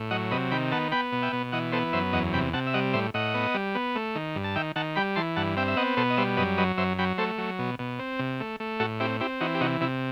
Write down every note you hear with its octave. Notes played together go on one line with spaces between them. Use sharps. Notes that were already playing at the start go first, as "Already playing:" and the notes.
Already playing: A2
F#3 D#5 F#5
C3 B4 D#5
D#3 G5 B5
B3 F#5 A5
B3 G5 B5
B2
E5 G5
B2
E3 D#5 F#5
B3 A4 C5
F#2 C5 E5
E2 D#5 F#5
C3 G5 B5
C3 F#5 A5
E5
G3 D#5 F#5
A2 C5 E5
A2 D#5 F#5
B3
G3
B3
A3
D#3
G2
A5
D#3 E5 G5
D#3 F#5 A5
G3 G5 B5
E3 A5 C6
G2 F#5 A5
C4 E5 G5
E5
B3 D#5 F#5
B2 A4 C5
D#5
G3 C5 E5
F#2 B4 D#5
F#3 B4 D#5
F#2 C5 E5
F#3 G5 B5
A3 A4 C5
F#3
B2
B2
C4
C3
A3
A3
A2 F#4 A4
C4 E4 G4
C4 E4 G4
E3 D#4 F#4
G4
C3 D#4 F#4
C3 E4